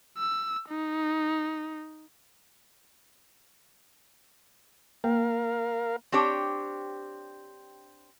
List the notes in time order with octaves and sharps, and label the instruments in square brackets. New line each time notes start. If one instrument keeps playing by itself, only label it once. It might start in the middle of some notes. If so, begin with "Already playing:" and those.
[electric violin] E6
D#4
[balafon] A#3 [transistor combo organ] A#4 F5
[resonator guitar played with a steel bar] C4 D4 G4 C#5